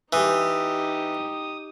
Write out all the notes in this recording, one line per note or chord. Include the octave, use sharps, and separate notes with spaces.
E3 D#4 G4 D#6